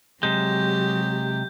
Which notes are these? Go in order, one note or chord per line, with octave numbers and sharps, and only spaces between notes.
C3 F#3 G#3 G4 G6